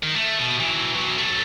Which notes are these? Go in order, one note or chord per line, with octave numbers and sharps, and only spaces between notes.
D#3
A3
B2
E3 F#3
B2 F#3
F#3 A3